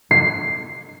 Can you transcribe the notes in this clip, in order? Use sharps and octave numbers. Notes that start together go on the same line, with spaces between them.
C7